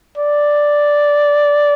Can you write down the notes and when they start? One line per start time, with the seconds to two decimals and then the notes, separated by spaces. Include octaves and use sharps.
0.18 D5